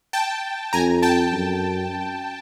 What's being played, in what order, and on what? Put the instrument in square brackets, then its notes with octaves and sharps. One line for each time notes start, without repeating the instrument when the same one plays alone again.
[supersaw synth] G5 A5
[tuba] F2 [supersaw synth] G#5 A#5
[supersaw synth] G5 A5
[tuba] F#2